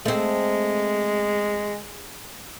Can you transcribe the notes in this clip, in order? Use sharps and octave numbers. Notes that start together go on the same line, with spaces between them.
G#3 A3 C4